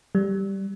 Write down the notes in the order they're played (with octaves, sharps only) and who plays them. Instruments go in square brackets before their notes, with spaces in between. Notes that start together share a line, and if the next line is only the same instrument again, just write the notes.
[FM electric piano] G3